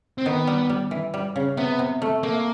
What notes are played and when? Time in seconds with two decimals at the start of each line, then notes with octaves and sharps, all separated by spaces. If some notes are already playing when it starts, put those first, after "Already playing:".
0.18 C4
0.26 D#3 B3
0.47 G3
0.69 G3
0.91 E3
1.14 G3
1.36 C#3
1.57 C3 B3
1.79 C3
2.02 A3
2.23 A3 A#3